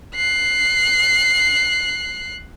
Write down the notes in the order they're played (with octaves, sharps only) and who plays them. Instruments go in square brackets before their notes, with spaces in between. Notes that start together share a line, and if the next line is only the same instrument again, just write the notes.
[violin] F#6 C7